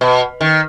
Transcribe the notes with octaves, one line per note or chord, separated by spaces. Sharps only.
B2
D#3